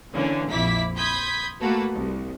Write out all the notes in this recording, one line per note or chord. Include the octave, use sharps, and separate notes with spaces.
D3 E3 A#3 C#4
A#1 F2 E4 D6 B6
B5 C6 D#6 G6 G#6 B6
A3 A#3 F#4 A4 B4
C2